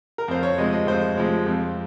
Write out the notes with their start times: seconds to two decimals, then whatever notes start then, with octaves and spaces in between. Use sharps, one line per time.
0.18 A#4
0.28 F2 C5
0.43 C#5
0.58 C3 F3 G#3 D#5
0.72 D#5
0.87 F2 C5
1.17 C3 F3 G#3
1.46 F2